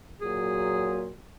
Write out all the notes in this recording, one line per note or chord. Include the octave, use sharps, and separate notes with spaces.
A#2 F#3 G#4